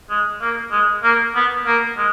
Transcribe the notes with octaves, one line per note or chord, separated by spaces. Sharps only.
G#3
A#3
G#3
A#3
B3
A#3
G#3